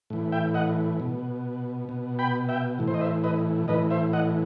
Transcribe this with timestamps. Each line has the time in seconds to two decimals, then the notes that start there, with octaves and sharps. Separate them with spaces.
0.10 A2 E3
0.32 E5 G5
0.54 D#5 F#5
1.00 B2
1.89 B2
2.19 G5 B5
2.49 E5 G5
2.79 A2 E3
2.88 C5
2.94 D#5
3.01 C5 E5
3.24 B4 D#5
3.68 A2 E3 B4 D#5
3.90 C5 E5
4.13 D#5 F#5